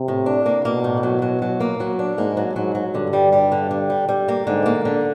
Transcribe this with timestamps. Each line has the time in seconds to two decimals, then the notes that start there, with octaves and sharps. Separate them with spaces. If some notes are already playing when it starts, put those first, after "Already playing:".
Already playing: C3
0.08 A2
0.26 D4
0.46 A#3
0.65 B2 A#3
0.84 A2
1.03 F#3
1.22 F#3
1.42 F#3
1.60 A#3
1.80 F#3
1.99 D4
2.18 G#2 A#3
2.37 F#3
2.56 G#2 F#3
2.75 F#3
2.94 G2 D3
3.13 G3
3.32 G3
3.52 D3
3.71 D3
3.90 G3
4.09 G3
4.28 A#3
4.47 G#2 D3
4.66 A#3
4.85 D3